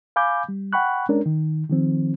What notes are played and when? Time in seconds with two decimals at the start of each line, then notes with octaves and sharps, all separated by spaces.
0.16 F5 G#5 B5 D6 G6
0.49 G3
0.73 F#5 G5 B5 C#6 F#6
1.09 G#3 C#4 D4 A#4
1.26 D#3
1.70 D#3 F3 C4